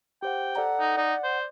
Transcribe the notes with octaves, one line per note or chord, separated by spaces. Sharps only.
G4 C5 F#5 G5
A4 D5 F#5 A#5
D#4
D#4 D5
C5